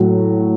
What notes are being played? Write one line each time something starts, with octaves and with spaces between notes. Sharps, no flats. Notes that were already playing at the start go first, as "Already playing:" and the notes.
Already playing: A2 F#3